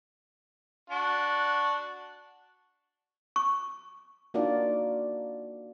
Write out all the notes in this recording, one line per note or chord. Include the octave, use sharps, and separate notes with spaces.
D4 F#4
C#6
A#3 D4 D#4 F4 F#4 D5